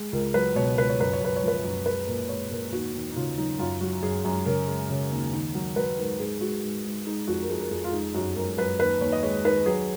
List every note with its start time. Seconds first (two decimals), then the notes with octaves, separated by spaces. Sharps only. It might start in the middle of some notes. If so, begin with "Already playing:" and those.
Already playing: G#3
0.13 C#2 A#4
0.34 F#3 B4
0.56 B2 C#5
0.78 C#2 B4
0.89 C#5
1.00 F#2 B4
1.13 C#5
1.21 F#2 B4
1.36 C#5
1.43 F3 B4
1.64 F#2
1.86 G#3 B4
2.07 A#2 A#4
2.29 G#3 C#5
2.51 A#2 A#4
2.72 D#2 F#4
2.94 D#2
3.11 D#4
3.16 C#3 F4
3.38 F#3 D#4
3.59 F#2 F4
3.81 F#3 F#4
4.02 F#2 G#4
4.25 F#2
4.46 C#3 A#4
4.67 G#3
4.90 C#3
5.11 D#2
5.33 D#3
5.55 F#3
5.76 F#3 B4
5.98 G#2 A#4
6.20 G#2 G#4
6.41 G#3 F#4
6.63 G#2
6.85 G#2
7.06 G#3 D#4
7.27 F2 F#4
7.42 A#4
7.49 F2 G#4
7.61 A#4
7.71 F2 G#4
7.84 F4
7.93 G#3 D#4
8.14 F#2 F#4
8.36 F#2 A#4
8.58 F#2 B4
8.79 D#2 B4
9.01 D#2 C#5
9.12 D#5
9.23 G#3 C#5
9.45 D#3 B4
9.66 F#3 G#4